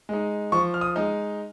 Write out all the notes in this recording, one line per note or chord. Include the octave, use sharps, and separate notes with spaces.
G#3 D#4
F3 C#6
F6
D#6
G#3 D#4